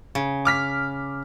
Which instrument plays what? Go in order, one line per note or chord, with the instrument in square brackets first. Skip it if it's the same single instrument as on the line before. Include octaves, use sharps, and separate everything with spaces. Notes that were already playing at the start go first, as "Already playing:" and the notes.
[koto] C#3
[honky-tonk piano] D6 F6 B6